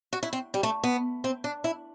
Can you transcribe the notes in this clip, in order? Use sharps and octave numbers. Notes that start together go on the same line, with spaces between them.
F#4
E4
C4
G3
A3
B3
C4
D4
E4